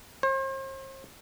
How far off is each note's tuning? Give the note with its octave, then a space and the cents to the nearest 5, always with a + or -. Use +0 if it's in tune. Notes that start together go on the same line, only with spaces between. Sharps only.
C5 +40